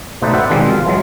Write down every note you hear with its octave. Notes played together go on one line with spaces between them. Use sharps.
B2 A3 D#4 B4 C5 D5
B4 C5 D5 E5 F#5 G5
B2 D#3 F3 G3 G#3 C4
F4
E3 F#3 G#3